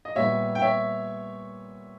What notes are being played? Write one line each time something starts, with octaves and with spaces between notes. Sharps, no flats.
D#5
A#2 G3 B3 C#5 E5
G5
C#5 E5